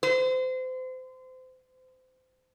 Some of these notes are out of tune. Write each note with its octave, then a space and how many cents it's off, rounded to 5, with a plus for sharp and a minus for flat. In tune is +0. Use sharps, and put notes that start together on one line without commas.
C5 -30